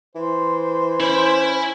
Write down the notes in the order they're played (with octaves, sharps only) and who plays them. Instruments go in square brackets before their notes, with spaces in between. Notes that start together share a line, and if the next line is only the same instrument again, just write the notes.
[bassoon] E3 [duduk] C5
[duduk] C#4 [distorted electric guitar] E4 B5 [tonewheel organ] C5